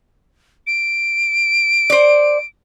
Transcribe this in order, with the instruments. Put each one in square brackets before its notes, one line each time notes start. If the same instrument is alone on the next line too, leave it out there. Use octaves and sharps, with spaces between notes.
[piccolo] D7
[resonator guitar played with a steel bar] C5 D5